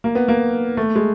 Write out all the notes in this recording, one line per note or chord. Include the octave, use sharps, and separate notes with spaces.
A#3
B3
A#3
A3
G#3